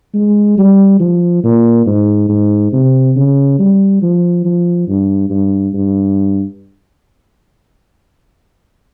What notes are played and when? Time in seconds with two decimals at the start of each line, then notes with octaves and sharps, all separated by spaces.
0.14 G#3
0.58 G3
1.00 F3
1.43 A#2
1.86 G#2
2.29 G#2
2.72 C3
3.16 C#3
3.59 G3
4.02 F3
4.45 F3
4.88 G2
5.30 G2
5.74 G2